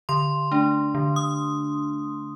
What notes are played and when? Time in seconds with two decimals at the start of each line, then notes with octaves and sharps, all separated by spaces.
0.09 D3 C6
0.52 A3 D4
0.95 D3
1.16 D#6